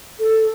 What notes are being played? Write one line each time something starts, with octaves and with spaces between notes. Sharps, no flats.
A4